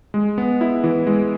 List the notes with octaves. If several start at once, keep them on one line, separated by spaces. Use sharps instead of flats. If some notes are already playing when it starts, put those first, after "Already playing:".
G#3
B3
E4
E3
G#3